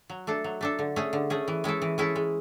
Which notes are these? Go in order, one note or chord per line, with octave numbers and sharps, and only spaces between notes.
F#3
A3 D4 A4
F#3
A3 D4 A4
D3
A3 C#4 G#4
D3
A3 C#4 G#4
E3
G#3 C#4 E4 A4
E3
G#3 C#4 E4 A4
G#3